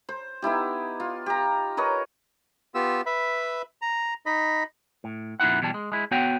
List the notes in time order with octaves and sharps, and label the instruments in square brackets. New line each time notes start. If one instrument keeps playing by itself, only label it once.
[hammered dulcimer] C5
B3 D#4 E4 G4
F4
G4 A#5
A#4 B4 C#5 D#5
[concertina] B3 F4 G4 E6
B4 E5 B5
A#5
D#4 D#5 B5
[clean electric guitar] A2
F2 A#2 D#4 E4 F#5
B2 E3 G3 A5
G#3
G#3 E4
B3 F#4 C#5 F#5 G5